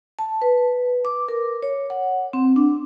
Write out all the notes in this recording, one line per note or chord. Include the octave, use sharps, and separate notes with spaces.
A5
B4
D6
A#4
C#5
F#5
C4
D4